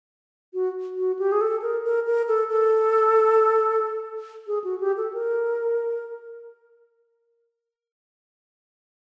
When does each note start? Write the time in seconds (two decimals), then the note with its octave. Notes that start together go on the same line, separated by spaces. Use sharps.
0.54 F#4
0.97 F#4
1.19 G4
1.32 G#4
1.41 A4
1.62 A#4
1.85 A#4
2.07 A#4
2.28 A4
2.50 A4
4.47 G#4
4.64 F#4
4.80 G4
4.97 A4
5.14 A#4